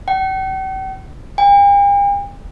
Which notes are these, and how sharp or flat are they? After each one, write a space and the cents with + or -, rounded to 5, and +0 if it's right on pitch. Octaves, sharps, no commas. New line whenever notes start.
G5 -45
G5 +45